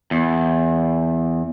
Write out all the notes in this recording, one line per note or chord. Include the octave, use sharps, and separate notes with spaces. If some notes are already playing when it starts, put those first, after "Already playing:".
E2